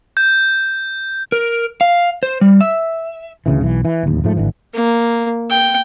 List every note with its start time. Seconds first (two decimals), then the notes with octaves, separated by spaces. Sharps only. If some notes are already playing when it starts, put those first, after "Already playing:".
0.17 G6
1.32 A#4
1.81 F5
2.23 C5
2.41 G3
2.61 E5
3.46 D2 C#3 E3
3.61 B1 E3
3.85 E3
4.03 D1 D#2
4.24 G#2 F3 A3
4.37 G#1 D3 E3
4.74 A#3
5.50 G5